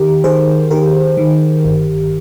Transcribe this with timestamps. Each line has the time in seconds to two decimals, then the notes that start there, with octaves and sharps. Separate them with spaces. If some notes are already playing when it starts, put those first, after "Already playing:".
Already playing: D#3 G4 A#4
0.24 D#3 G#4 C5
0.71 D#3 G4 A#4
1.17 D#3
1.65 G1